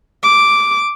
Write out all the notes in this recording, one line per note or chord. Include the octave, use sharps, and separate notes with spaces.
D6